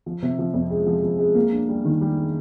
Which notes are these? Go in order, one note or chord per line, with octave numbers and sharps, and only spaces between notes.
F3
C3
F3
F2
G#3
F3
F3
G#3
A#3
D4
G3
D#3
G3
D4